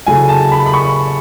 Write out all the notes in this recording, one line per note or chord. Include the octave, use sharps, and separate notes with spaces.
C#3 F#3 A3 E4 G#5
A5
B5
B5
C#6